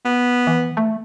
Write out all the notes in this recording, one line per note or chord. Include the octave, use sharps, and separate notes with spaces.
B3
E3
A3